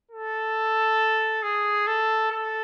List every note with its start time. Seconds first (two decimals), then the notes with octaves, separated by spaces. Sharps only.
0.11 A4
1.43 G#4
1.87 A4
2.31 A4